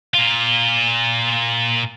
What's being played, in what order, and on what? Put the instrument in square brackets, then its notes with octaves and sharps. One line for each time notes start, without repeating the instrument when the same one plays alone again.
[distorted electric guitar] A#2 F4